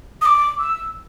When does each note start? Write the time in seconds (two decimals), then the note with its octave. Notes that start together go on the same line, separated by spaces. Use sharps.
0.22 D#6
0.26 D6
0.59 E6